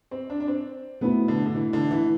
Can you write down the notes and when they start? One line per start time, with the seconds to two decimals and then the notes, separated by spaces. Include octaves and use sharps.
0.11 C4
0.30 D4
0.40 D4
0.48 C4
1.01 B2 A3 B3 E4
1.28 D3
1.46 D3
1.55 E3
1.73 D3
1.91 E3